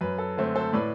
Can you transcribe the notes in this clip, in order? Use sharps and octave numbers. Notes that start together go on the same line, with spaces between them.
F#2 B4
A4
D3 A3 C4
A4 C5
A2 B4 D5